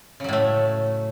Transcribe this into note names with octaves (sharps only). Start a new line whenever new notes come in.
A2 C#3 F#3 A3